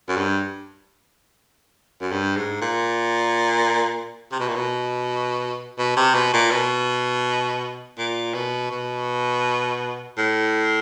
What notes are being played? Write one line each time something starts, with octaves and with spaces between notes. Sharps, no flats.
F#2
G2
F#2
G2
G#2
A#2
C3
B2
A#2
B2
B2
C3
B2
A#2
B2
A#2
B2
B2
A2